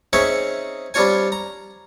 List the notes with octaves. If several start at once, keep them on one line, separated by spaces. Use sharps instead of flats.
C4 C#4 D#4 G#4 C#5 E5
G3 C4 D4 F4 C#5 G#5
A#5